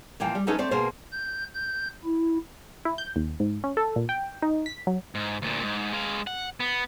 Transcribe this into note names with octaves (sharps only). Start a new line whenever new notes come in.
A#2 E3 F3 A#3 G5
G3
F#3 A3 C#4 D#4 A4 B4
A3 C4 C5 D5
B2 A#3 G#4 A#4 C5
G6
G6
E4
E4
G6
D#2
G#2
C#4
A4
A#2
G5
D#4
B6
F#3
G#2
D2 A#2
G#2
G#3 F5
F#5
B3